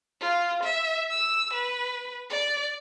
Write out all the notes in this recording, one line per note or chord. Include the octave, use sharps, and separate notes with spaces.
F4
E5
E6
B4
D5